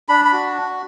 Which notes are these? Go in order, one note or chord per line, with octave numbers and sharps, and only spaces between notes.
D4 B5
B5
F#4